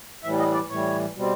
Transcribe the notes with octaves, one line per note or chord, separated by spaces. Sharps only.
A2 E3 G3 E5
D#5
D5
A2 E3 G3 C#5
B2 G3 C4